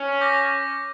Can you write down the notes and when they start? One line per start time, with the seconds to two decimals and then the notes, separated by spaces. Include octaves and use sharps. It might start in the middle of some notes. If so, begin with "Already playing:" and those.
Already playing: C#4
0.21 D6 G6 A#6